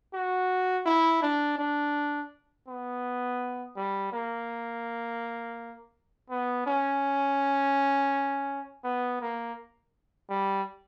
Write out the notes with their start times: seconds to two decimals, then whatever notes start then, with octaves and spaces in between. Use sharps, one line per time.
0.14 F#4
0.86 E4
1.23 D4
1.59 D4
2.68 B3
3.77 G3
4.13 A#3
6.30 B3
6.67 C#4
8.84 B3
9.22 A#3
10.30 G3